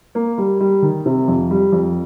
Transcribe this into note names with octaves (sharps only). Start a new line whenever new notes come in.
A#3
G3
G3
D#3
C3
F2
G3
F2